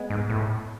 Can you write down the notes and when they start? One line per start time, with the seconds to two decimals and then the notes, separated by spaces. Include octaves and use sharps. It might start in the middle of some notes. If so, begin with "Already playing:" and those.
Already playing: G#3 B3
0.10 G#2
0.30 A2